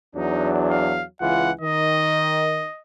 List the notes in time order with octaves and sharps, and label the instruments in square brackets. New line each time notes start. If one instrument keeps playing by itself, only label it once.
[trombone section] E2 F#3 D4 [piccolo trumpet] D#4
[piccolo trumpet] F5
[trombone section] C#2 E3 F4 [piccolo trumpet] F#5
[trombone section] D#3 [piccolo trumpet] D#5